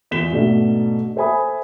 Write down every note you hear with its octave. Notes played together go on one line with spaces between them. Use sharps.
E2 F4 B6 E7 G7
G#2 B2 A3 D4
A4 C5 E5 G#5 B5 D#6